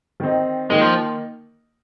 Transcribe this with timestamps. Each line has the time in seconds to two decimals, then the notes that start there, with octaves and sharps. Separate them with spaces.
0.20 D#3 C4 D#4
0.70 D#3 G#3 A#3 D#4
0.81 F3